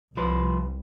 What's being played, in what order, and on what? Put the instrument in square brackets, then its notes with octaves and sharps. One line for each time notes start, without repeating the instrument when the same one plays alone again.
[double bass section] C2 [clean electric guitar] F3 B4 C5